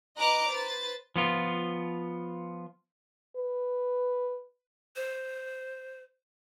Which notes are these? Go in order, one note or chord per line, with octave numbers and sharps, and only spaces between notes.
B4 D#5 A#5 D6 F#6
B4 C5 A6
F3 B3 F4
B4
C5